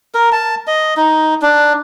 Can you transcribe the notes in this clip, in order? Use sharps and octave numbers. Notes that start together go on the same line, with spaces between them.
A#4
A5
D#5
D#4
D4